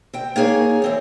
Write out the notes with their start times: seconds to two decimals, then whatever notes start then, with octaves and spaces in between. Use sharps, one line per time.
0.13 C4 G5
0.36 A#3 D#4 G#4 C#5
0.82 E3 C4 C#5